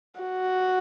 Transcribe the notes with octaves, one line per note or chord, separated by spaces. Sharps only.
F#4